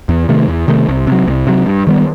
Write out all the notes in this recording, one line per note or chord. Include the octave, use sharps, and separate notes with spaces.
E2
C3 D#3 A3
E2
C3 D#3 A3
C2
C3 F#3
C2
C3 F#3
G2
D#3 G3 B3